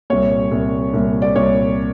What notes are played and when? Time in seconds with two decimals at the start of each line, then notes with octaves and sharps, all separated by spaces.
0.10 C2 A#2 C#5
0.52 C2 A#2
0.94 C2 A#2
1.22 D5
1.35 C2 A#2 C#5